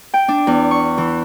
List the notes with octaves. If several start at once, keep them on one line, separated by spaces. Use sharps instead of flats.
G5
D4
E2
C#6
E3